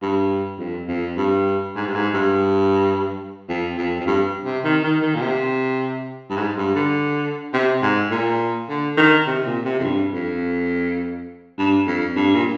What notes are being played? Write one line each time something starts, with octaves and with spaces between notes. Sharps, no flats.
G2
F2
F2
G2
G#2
G2
G#2
G2
F2
F2
F2
G2
C3
D#3
D#3
D#3
A#2
C3
G2
G#2
G2
D3
C3
G#2
A#2
D3
D#3
C3
A#2
C3
F2
G2
F2
G2
F2
G2
A#2